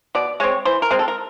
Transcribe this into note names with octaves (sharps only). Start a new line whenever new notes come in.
B2 D5
G#3 C4 C#5
E3 C5
A#4
G#3 C4
A4
A#4